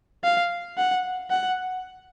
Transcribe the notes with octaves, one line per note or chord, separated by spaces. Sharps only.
F5
F#5
F#5